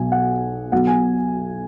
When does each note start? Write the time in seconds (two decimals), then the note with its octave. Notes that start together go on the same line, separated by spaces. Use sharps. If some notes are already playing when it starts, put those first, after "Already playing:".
Already playing: B1 B2 F#3 G#5
0.12 F#5
0.72 B1 B2 F#3 F#5
0.87 G#5